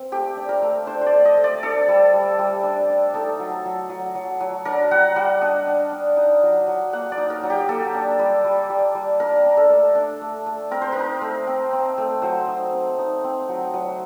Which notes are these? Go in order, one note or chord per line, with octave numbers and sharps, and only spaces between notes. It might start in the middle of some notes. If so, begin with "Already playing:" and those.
Already playing: C4
A3 G4
D4
A#4
A3
D4 C5
C5
D5
A3
D#5
A3
D5
D4 A4
G3
G3
G3
D4
D4
D#4 A4
F#3
F#3
F#3
F#3
F#3
D4 A#4
G3 F#5
G3 F#5
D4 D#5
D4
D4
D#4
F#3
F#3
A#3 F#5
D5
D#4
A#4
F#3
G4
A#3 A4
D4
G3
G3
G3
G3
D4 A#4
D4
A4
A3
D4
A3
A3
C4 A#4
C5
D#4 A#4
A3
C4
C4
A3
F#3 C5
D#4
C4
D#4
C4
F#3
F#3